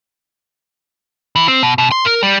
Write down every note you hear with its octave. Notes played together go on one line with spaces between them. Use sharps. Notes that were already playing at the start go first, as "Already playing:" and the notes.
E3
C4
B2
B2
C6
A#4
G3